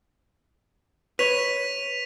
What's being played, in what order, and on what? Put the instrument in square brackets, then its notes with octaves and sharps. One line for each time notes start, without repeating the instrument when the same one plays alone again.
[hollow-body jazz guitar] B4 C#5 [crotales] B6 D#7 F7